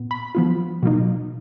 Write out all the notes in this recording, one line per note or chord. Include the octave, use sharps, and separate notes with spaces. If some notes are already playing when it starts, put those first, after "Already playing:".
Already playing: A#2 B3
B5
F3 B3 F4
B2 F#3 A#3 D#4